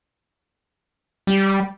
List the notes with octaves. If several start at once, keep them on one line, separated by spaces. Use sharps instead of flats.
G3